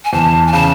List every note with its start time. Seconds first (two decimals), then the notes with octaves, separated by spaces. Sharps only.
0.05 G#5
0.13 E2 A5
0.47 G#5
0.52 C#3 A5